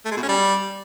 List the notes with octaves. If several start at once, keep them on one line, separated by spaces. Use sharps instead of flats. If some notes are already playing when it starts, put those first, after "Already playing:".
A3
G#3
B2
C#4
G3